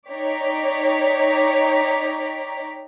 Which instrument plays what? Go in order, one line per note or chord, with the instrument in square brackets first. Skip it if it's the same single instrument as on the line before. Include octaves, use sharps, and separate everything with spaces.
[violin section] D#4 C#5 D5 G5 A#5 B6